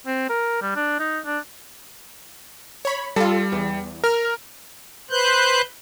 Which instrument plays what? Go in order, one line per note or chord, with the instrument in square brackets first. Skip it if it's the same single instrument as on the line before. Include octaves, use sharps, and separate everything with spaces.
[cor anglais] C4
A#4
G3
D4
D#4
D4
[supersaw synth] C#5 B5
[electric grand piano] G3 [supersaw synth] F4 A4
[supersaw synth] E2
[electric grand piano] A#4 [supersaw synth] F6
[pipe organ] B4 C5 F#6 G6